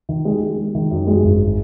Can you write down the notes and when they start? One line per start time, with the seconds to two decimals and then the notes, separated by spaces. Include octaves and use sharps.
0.09 D#3
0.25 G#3
0.41 G#3
0.58 G#3
0.75 D#3
0.91 F#2
1.07 G#3
1.23 G#1